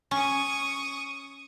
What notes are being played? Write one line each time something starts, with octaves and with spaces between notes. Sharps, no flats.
C#4 C#6 D#6